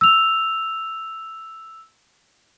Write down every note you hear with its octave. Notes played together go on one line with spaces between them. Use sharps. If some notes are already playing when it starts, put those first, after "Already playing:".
E6 F7